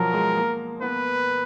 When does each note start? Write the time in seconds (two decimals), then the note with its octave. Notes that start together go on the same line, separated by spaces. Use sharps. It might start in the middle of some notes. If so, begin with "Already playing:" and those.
Already playing: B2 F3 F#3 A#4
0.14 G#3
0.37 A#3
0.82 B3 B4